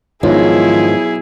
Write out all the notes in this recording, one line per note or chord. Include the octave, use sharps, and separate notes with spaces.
B1 G#2 D#3 F3 E4 G#4